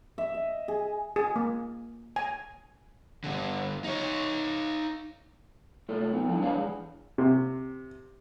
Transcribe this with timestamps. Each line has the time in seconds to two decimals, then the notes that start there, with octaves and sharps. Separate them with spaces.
0.18 E5
0.34 D#5
0.68 G#4
1.16 G#4
1.36 A#3
2.16 G#5
3.24 G2 D3
3.84 D#4 C#5
5.89 A3 F4 A4 C#5
6.13 B3 D#4
6.27 F3 G3 A3 D4 E4
6.40 G3 G#3 D4 B4 C#5 F5
6.56 E3 G#4
7.18 C3